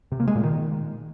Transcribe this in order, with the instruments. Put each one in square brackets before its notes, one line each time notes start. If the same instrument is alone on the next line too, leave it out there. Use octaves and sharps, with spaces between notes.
[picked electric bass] C3
A#3
G#3
A#2
D#3